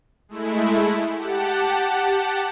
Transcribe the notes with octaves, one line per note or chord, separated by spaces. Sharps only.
G#3 A3 E4
G4 F#5 A5